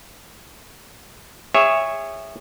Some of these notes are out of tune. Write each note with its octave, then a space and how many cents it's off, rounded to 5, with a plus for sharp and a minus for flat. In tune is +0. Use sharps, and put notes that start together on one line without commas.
G#4 -35 C#5 +0 E5 +0